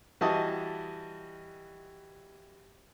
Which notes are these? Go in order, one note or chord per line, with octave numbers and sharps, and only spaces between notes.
E3 G3 F#4 D#5 A5 D#6